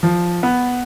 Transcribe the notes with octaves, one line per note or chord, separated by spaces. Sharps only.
F3
B3